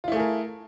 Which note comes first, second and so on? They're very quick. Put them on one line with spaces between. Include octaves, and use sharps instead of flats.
F4 E4 A3 G#4 A#4